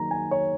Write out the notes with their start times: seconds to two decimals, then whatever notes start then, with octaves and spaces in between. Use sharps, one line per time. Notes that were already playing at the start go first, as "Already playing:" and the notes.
Already playing: D#3 F#3 A#3 A#5
0.11 G#5
0.31 C#5